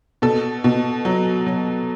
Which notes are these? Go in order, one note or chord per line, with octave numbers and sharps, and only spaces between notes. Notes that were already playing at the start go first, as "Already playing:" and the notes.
B2 A4
B2
F#3
F#3